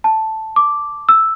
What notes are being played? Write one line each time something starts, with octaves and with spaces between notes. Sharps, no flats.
A5
D6
E6